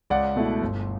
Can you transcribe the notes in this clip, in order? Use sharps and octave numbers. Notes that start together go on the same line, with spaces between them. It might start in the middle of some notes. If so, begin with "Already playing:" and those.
C#2 D5 F#5
B2 A3 E4
G1